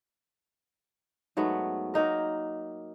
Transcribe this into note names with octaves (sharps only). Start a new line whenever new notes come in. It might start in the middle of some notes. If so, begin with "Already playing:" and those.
G#2 F#3 A3 B3
F#3 A#3 D#4 A#4